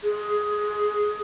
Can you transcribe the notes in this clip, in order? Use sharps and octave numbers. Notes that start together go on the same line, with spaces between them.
G#4